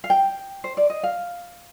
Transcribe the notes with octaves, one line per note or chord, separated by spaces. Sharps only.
F5
G5
C5
D5
D#5
F5